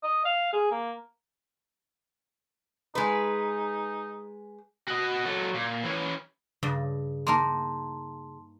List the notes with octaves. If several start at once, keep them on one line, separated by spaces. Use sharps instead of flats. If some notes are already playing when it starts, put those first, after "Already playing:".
D#5
F5
G#4
A#3
G#3 D#4 B4
F#4 D#5
F#3 A4
A#2
E3 C#4
G2 C#3
A#3 D#4 A#4 A5 C6